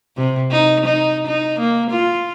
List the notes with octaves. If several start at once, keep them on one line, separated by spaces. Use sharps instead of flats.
C3
D#4
D#4
D#4
A#3
F4